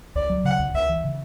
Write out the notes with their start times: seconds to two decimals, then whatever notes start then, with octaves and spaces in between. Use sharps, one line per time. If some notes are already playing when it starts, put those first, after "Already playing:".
0.15 C#2 D5
0.30 F#3
0.44 C#3 F#5
0.59 C#2
0.74 C#2 E5
0.89 E3
1.04 C#3